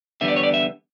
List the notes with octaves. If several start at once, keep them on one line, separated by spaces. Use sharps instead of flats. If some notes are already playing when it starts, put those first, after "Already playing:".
E2 D3 G3 B3 E5
D5
C#5
D5
E5